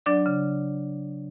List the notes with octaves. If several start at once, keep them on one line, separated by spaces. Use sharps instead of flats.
F#3 D4 D5
C#3